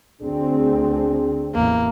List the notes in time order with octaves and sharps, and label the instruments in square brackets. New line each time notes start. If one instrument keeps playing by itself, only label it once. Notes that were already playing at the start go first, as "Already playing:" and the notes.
[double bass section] D2 C4 [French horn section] D4 G#4
[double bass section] A1 E2 [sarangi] A#3